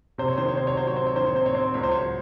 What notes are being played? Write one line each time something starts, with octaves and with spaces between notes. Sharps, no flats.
C3 C5
C#5
D#3 C5
C#5
C3 C5
C#5
F#3 C5
C#5
C4 C5
C#5
D#3 C5
C#5
C4 C5
C#5
C4 C5
C#2 C#5
C5
F#3 C#5